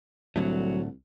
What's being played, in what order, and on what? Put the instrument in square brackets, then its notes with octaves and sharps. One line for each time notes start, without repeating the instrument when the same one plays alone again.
[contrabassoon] C2 [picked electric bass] A2 D3 A3 [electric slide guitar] F#3